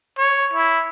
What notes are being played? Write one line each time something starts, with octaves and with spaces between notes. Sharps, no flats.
C#5
E4